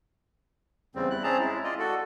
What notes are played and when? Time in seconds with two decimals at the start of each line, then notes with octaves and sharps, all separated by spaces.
0.95 E2 C#3 G3 C4
1.10 E4 F#6
1.23 C4 C#4 G#4 A5 A#5
1.39 G#3 E4
1.64 F4 D5 D#5
1.79 F#4 A4